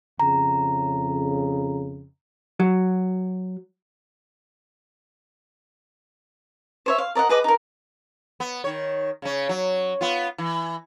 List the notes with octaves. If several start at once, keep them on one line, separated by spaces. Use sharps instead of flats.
F2 C#3 A#5
F#3
C5 C#5 E5
F5
A#4 D5 D#5 F#5
G#4 B4 D#5 D6
D#4 A#4
B3
D#3 C#5
C#3 C#4
F#3
B3 F4
E3